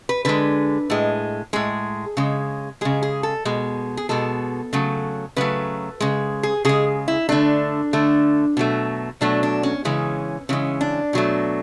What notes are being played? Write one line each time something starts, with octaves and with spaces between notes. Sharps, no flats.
B4
D3 G#3 B4
A2 G#3
A2 G#3 G#4
C#3 G#3
C#3 G#3 G#4
G#4
A4
B2 G#3
G#4
B2 G#3 A4
C#3 F#3 A3
C#3 F#3 A3 B4
C#3 G#3
G#4
C#3 G#3 G#4
E4
D3 A3 D4
D3 A3
B2 F#3 A3
B2 F#3 A3 D4
D4
C#4
C#3 E3 G#3 C#4
C#3 E3 G#3 C#4
D4
B2 F#3 A3